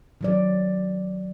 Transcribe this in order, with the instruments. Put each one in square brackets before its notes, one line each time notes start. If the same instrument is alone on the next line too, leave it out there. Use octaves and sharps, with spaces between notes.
[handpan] D#3 F#3 D5